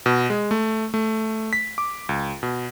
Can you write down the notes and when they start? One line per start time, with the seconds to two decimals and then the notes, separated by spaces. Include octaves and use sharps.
0.06 B2
0.30 G#3
0.51 A3
0.94 A3
1.53 B6
1.78 D6
2.09 C#2
2.43 B2